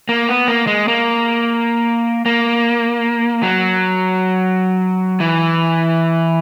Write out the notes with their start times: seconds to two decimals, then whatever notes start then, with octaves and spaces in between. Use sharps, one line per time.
0.09 A#3
0.29 B3
0.48 A#3
0.67 G#3
0.88 A#3
2.26 A#3
3.43 F#3
5.20 E3